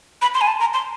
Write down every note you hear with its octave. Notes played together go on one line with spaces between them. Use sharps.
B5
C6
G#5
A5
A#5
C6